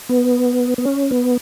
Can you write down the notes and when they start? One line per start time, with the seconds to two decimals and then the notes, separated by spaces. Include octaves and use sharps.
0.09 B3
0.78 B3
0.85 C#4
1.11 B3